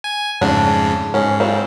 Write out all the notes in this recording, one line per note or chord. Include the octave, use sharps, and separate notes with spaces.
G#5
F2 G#2 C#3 A3 D4
G#2 C#4
G3 C4 F4